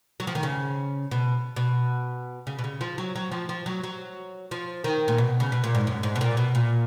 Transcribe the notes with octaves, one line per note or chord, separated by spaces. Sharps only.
F#3
F3
D#3
C#3
B2
B2
C#3
B2
C#3
F3
F#3
F#3
F3
F3
F#3
F#3
F3
D#3
A#2
B2
C#3
B2
A#2
G#2
F#2
G#2
B2
A#2
B2
A#2